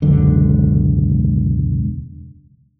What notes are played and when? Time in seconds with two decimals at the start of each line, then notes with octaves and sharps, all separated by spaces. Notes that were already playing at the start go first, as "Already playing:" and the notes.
0.02 E1 C#2 F#2 D3